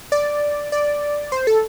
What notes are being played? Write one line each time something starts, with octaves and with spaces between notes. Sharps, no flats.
D5
D5
C5
A4